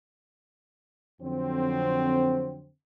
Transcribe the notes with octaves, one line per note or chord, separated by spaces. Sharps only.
F2 D3 F#3 C4